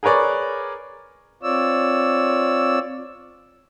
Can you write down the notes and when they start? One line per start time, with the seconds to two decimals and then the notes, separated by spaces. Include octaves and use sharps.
0.03 G#4 A#4 B4 C#5 D5
1.43 C4 F4 C#5 D5 E6